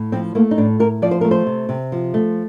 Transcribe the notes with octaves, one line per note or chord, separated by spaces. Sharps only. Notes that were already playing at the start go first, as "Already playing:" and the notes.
Already playing: A2
F3 C4
A3 A#3
D#4
A2 D4
A2 A#4
F3 D5
C5
A3 A#4
C5
C3
C3
F3
A3